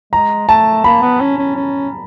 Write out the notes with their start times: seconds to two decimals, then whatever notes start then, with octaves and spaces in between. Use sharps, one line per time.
0.13 G#3 A#5
0.49 A3 A5
0.84 A#3 B5
1.02 B3
1.21 C#4
1.38 C#4
1.56 C#4